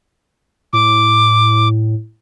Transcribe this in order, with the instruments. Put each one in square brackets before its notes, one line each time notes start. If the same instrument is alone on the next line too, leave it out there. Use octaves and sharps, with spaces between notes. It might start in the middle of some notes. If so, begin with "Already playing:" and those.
[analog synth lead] A2 [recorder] D6